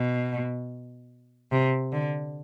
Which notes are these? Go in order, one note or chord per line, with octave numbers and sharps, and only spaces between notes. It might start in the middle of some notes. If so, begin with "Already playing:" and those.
Already playing: B2
C3
D3